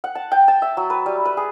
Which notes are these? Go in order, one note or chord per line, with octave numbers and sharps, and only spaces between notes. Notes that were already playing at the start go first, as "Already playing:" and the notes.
F#5
A5
G5
A5
E5
F#3
B4
G3
B4
G#4